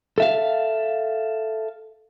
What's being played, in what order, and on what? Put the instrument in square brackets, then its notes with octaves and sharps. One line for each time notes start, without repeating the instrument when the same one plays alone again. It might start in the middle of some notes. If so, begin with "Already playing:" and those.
[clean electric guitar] A4 E5 F5